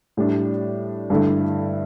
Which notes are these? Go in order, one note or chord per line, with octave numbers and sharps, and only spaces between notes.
A2 G3 D4
G2 D3 A3 E4